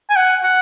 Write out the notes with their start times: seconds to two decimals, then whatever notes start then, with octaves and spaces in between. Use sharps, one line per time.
0.10 G#5
0.16 F#5
0.43 F#5